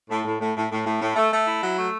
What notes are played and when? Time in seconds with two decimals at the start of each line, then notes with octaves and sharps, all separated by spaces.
0.09 A2
0.25 A2
0.39 A2
0.55 A2
0.70 A2
0.85 A2
1.00 A2
1.16 A3
1.31 A3
1.47 E4
1.62 F#3
1.77 A3